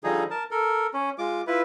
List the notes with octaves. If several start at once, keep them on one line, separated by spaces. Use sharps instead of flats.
D3 F3 G3 D#4 G#4
A#4 A5
A4 A#4
C#4
G#3 F4 D6
E4 F4 B4